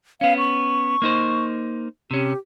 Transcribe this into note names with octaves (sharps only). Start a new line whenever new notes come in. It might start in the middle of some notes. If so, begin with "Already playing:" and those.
B3 C#4 F5
C#6
A#3 D#4 C5
C3 C#4 G4